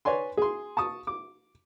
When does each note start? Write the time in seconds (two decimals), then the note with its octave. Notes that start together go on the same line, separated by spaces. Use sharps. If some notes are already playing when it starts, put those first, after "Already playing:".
0.05 B4 C#5 D5 G#5 C6
0.37 G#4 C6
0.77 A5 C#6 D#6
1.07 D6